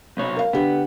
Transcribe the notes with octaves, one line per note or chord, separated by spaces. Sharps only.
C2 B2 C#5
A#4 F5
D3 B3 G4